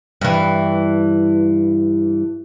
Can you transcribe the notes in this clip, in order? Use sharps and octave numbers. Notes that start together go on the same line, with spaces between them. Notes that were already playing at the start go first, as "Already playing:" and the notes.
G2 E3